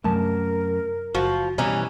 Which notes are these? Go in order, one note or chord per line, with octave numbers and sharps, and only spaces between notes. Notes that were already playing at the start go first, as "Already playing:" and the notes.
F#2 C3 F#3 A3 A#4 A5
F#1 F3 F#4
B2 E3 G3 C#4 D#5 A#5